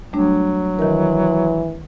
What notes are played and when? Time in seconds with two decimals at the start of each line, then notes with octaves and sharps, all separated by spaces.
0.13 F#3 G3 A3 D4
0.79 D#3 E3 A#4